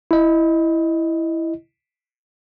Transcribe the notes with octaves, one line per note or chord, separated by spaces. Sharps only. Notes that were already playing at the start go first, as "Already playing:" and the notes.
E4 D#5